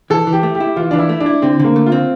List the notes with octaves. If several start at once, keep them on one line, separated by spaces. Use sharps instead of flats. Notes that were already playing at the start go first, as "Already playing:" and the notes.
E3 A4
E3
G4
A3
G4
E4
E3 F4
E3 D4
E4
A3
D4
E4
D3 C4
D3 A#3
A3
F4
C4